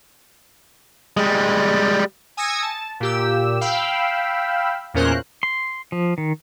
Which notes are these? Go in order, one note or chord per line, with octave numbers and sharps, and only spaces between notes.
G3 G#3
G#5 D#6 E6 G#6 A#6 C#7
A5
A#2 G4 E6
F5 G5 B5 E6
E2 A#2 C#4 A#4 C5 F#6
C6
F3
D#3